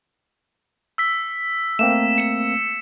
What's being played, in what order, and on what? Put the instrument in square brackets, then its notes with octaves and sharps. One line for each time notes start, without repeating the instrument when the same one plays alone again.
[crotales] E6 B6
[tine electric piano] A3 A#3 C4 [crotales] E7
[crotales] C#7 E7